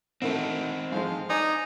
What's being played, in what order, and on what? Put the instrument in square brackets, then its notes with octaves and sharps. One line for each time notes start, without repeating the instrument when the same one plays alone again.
[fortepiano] B2 D#3 A3 [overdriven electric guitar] C4 D#4 [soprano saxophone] F#5
[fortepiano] G#2 F3 G#3 [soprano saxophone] F5
[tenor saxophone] D#4 [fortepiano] D5 [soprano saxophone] G#5